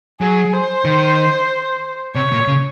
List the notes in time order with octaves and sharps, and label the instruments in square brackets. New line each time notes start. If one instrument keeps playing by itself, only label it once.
[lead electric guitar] F#3 [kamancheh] G#4
[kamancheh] C5
[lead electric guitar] D#3
[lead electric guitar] C3 [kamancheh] C#5
[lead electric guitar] A#2
C#3